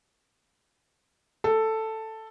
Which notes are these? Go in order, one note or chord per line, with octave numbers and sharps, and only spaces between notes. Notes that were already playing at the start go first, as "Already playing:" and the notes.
A4